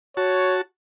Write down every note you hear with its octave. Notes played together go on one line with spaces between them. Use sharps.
F#4 C#5 A5